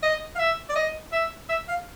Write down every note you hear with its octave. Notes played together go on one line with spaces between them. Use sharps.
D#5
F5
E5
D5
D#5
E5
E5
F5